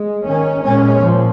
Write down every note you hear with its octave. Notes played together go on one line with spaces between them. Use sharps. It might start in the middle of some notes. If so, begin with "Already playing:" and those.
Already playing: G#3
D#3 C#4
A#2 G#3 C#4
A#2 F3